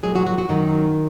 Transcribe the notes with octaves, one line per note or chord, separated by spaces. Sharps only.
A#2 F#3 G#3 G#4
F#3 F#4
F#3 F#4
F#3 F#4
F#2 D#3 F#3 D#4